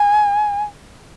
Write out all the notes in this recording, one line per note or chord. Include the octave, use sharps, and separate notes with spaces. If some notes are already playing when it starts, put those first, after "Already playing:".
Already playing: G#5